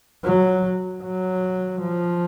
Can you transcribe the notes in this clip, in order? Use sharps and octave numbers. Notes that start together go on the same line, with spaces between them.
F#3
F#3
F3